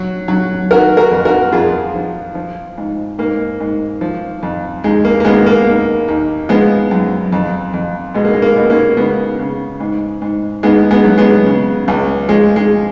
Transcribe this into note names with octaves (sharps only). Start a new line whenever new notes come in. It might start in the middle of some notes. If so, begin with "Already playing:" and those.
Already playing: F#3
F#3
D#3 F#4 A#4
F#4 A#4
F2
F#4 A#4
F2 F4 G#4
F3
F3
G#2
G#2 A#3
G#2
F3
F2
D#2 G#3
A#3
A#3
D#2 G#3 B3
A#3
D#2
D#2
F3 G#3 B3
F#2
F2
F2
B2 G#3
A#3
G#3
A#3
B2
A#3 C#4
C#3 G#3 B3
C#3
G#2
G#2
D#2 G#3 B3
G#3 B3
F#3
G#3 B3
C#3
C#2
F3 G#3
G#3